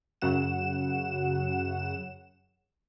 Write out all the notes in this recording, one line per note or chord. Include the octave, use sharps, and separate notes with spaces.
F#2 C#3 F#3 F#5 E7